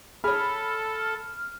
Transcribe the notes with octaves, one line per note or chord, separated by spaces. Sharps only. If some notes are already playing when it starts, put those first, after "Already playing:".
G#4 A4 C#5 B5 F6